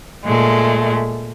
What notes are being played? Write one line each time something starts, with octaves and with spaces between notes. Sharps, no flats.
A#2 G#3 A3